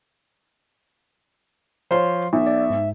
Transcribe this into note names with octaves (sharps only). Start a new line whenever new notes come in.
F3 C5 C#5 F5 C6
B1 E5
D5
G#2